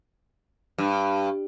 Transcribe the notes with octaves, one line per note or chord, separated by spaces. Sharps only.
G2